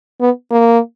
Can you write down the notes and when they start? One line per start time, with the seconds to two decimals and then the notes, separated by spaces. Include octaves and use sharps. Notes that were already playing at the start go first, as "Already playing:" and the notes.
0.21 B3
0.51 A#3